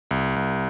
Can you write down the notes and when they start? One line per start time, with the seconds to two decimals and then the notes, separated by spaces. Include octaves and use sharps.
0.11 C2
0.36 C2